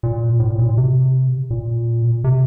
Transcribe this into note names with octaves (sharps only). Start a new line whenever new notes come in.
A#2
A2
A#2
A#2
C3
A#2
C3